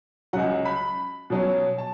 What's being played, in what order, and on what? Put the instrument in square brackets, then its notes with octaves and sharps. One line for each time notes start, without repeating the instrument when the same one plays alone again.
[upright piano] C#2 C#3 F#3 F#5
B5
B2 F#3 C#4
A5